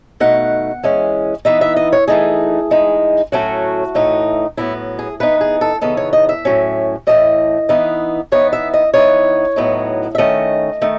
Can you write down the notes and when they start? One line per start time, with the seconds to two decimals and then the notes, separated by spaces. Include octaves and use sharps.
0.20 B2 A3 D#4 F#5
0.83 E3 G#3 C#4
1.45 E3 B3 D#4 E5
1.61 E5
1.76 D#5
1.93 C#5
2.07 E3 A3 D#4 G#4
2.71 E3 G#3 D#4
3.32 A2 F#3 A3 C#4 F#4
3.95 A2 E3 A3 D#4
4.57 A2 F#3 B3 E4
4.99 G#4
5.20 E3 B3 D#4 B4
5.41 G#4
5.61 A4
5.81 C#3 E3 B3 D#4 A4
5.97 C#5
6.13 D#5
6.29 E5
6.45 A2 F#3 C#4
7.07 A2 E3 A3 D#5
7.69 E3 B3 D#4
8.32 E3 B3 D#4 C#5
8.53 E5
8.74 D#5
8.94 E3 B3 D#4 C#5
9.56 A2 F#3 B3 D#4
10.15 E5
10.18 D#3 A3 C#4 D#5
10.81 D#3 A3 D#4